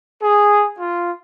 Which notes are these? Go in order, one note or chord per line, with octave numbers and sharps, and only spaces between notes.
G#4
F4